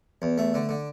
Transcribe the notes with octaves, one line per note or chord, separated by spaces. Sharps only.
E2
A3
D3
D3